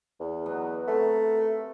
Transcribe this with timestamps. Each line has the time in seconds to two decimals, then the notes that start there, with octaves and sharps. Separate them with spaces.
0.20 E2
0.46 B2 F#3 B3
0.88 C3 A3 A#4